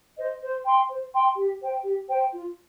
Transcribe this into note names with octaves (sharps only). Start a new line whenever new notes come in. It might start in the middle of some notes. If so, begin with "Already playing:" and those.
C5 D#5
C5
G5 C6
C5
G5 C6
G4
C5 G5
G4
C5 G5
F4